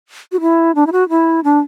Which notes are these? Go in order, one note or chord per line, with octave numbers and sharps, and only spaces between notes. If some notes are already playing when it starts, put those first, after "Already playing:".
F#4
E4
D4
E4
F#4
E4
D4